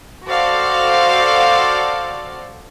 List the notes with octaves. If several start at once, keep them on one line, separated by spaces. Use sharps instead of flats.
F#4 A4 C5 D5 F5